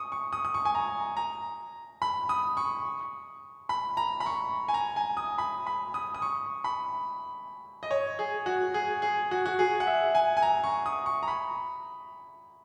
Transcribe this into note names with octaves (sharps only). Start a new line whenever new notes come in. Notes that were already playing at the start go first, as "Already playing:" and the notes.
Already playing: C#6 D#6
C#6
D#6
D#6
C#6
G#5
A#5
A#5
B5
D#6
C#6
B5
A#5
B5
C#6
G#5
A#5
G#5
D#6
B5
B5
D#6
D#6
C#6
B5
D#5
C#5
G#4
F#4
G#4
G#4
F#4
F#4
G#4
F#5
E5
G#5
G#5
A#5
C#6
D#6
C#6
A#5
B5